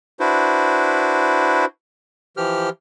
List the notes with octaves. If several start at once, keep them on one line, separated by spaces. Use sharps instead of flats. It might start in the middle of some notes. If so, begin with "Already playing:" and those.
D4 E4 F#4 B4 C5
E3 F3 G4 F6